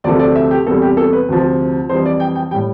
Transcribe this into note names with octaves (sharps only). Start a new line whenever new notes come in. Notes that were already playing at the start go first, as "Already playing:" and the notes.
D2 C3 F3 A3 D5
D5
E5
G4
E2 C3 G3 A4
G4
A4
B4
D2 C3 F3
F2 E3 G3 C5
D5
G5
G5
A2 G3 G5